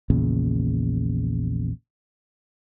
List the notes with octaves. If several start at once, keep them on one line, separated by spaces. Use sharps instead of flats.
A#1 E2 A#2 C#3